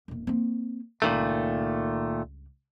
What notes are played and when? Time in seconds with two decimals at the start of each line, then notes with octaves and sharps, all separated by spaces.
0.08 E1 A#2
0.27 A#3 C4
1.02 C#2 G2 A#2 D#3 A3